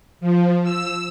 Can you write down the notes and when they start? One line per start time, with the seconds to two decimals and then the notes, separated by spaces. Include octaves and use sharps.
0.20 F3
0.63 E6